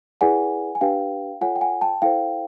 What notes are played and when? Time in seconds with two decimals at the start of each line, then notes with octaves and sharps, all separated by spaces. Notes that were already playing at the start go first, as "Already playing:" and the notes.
0.21 E4 G#4 B4 D5 F#5 G#5
0.75 G#5
0.81 D4 G4 B4 F5 G5
1.41 F4 A4 C#5 F#5 G#5
1.56 G5
1.61 F#5 G#5
1.81 G5 A5
2.02 E4 A4 C5 F5 G5